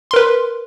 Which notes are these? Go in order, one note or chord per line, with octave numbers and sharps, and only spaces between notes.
A#4 B4 C6